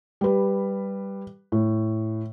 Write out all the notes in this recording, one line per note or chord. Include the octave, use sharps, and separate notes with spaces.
G3 B4
A2